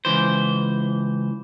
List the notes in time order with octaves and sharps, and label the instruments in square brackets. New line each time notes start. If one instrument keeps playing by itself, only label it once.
[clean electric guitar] C#2 E3 C5